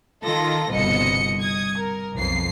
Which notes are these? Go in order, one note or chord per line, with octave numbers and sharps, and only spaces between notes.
D#3 F4 A4 A#6
G1 C2 B2 D#5 C#7
D#6 G#6
A#4
B1 F2 C7